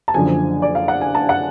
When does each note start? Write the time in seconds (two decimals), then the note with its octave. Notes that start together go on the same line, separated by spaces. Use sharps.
0.08 A5
0.14 F#1 F#2 D3 F3 G#5
0.62 D5
0.75 F5
0.88 F#5
1.01 G#5
1.15 A5
1.29 F#5